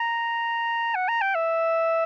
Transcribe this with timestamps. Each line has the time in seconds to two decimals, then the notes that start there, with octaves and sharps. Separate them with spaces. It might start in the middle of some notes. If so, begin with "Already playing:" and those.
Already playing: A#5
0.95 F#5
1.09 A#5
1.21 G5
1.35 E5